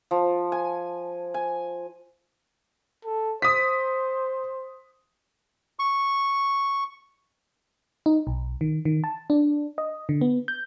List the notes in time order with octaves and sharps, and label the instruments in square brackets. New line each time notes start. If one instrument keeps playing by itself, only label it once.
[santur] F3
G#5
G#5
[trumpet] A4
[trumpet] C5 [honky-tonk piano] D#6 B6
[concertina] C#6
[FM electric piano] D#4
B1
D#3
D#3
A5
D4
D#5
D3
B3
G6